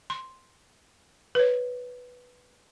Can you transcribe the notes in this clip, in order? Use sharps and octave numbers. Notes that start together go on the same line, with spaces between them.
C6
B4 C#5